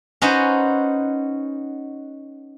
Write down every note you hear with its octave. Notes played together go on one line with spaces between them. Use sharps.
C#4 D#4 F#4 B4 C5